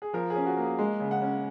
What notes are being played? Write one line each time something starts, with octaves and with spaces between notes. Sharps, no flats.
G#4
F3 A#4
G#4
C#4
F#4
A#3 G#4
G#3
C#3
F#5
C#4